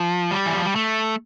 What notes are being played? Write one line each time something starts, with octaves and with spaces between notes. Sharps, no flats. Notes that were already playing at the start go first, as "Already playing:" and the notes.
Already playing: F3
G3
E3
F3
G3
A3